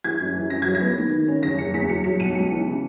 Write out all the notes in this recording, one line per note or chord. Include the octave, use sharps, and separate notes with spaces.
E3 G#6
F#2
E3
F#2 A#6
F#3 G#6
A#6
B3
D#3
D#3
C#4
F#1 A#6
F#1 C#7
E2 B6
F#3 C#7
F#3 C#7
B1 D#7
C#2 C#7
E3
C#3